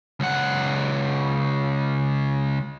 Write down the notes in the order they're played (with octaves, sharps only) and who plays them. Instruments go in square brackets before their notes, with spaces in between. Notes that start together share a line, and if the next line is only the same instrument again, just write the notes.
[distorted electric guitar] C#2 F#5